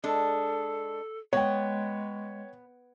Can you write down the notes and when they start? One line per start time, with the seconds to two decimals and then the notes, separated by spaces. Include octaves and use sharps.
0.04 G#3 D4 A4
1.33 G#3 B3 C#5 G5